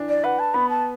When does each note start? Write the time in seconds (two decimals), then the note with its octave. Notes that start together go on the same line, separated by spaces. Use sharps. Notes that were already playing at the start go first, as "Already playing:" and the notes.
Already playing: E3 D4
0.09 D5
0.23 B4 F#5
0.39 A5
0.54 B3 B5
0.69 A5